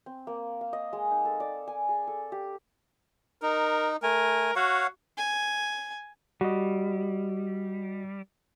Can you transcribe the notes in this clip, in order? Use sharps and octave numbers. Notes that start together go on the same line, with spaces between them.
C4
A#3
F5
D#5
G#3
D#4
A4
D5
G#5
G#4
A4
G4
D#4 A#4
A3 A#4 G#5
F#4 C#5 F5 F#5
G#5
G3 F#4 D#5